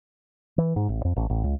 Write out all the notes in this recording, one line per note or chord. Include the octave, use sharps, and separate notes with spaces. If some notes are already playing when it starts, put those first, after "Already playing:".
E3
G#2
A1
F2
A1
A1
C#2